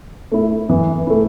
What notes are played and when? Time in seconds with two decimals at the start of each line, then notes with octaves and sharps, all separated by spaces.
0.32 A3 E4
0.70 E3
1.07 A3 E4